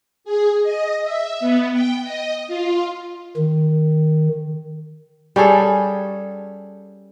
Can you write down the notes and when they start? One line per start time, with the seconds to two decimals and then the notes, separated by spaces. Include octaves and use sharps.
0.24 G#4
0.62 D#5
1.04 E5
1.40 B3
1.73 G5
2.03 D#5
2.48 F4
3.37 D#3
5.36 G3 C#4 G#4 A4